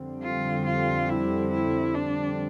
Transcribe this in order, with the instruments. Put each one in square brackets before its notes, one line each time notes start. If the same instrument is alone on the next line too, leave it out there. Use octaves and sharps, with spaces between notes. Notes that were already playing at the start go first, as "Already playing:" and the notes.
Already playing: [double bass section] F2 D3 G3 C4
[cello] F4
F4
E4
E4
D4